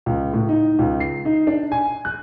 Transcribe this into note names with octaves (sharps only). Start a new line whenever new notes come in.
C#2
A2
D#4
C#2
C7
D#4
D4
G#5
F#6